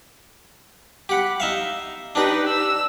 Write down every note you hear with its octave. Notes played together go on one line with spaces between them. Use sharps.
G4 F#5 B5
D#4 E5 F5
D4 D#4 G4 B4
E6